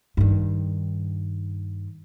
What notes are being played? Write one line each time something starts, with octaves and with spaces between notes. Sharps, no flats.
G2 D#3